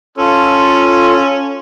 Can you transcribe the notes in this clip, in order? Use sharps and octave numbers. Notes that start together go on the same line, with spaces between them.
C#4 F4 A4